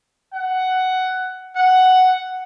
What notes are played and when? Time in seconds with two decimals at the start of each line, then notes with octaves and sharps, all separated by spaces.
0.33 F#5
1.56 F#5